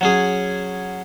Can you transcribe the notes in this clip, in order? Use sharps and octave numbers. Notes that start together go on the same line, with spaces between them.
F#3 C#4 G#4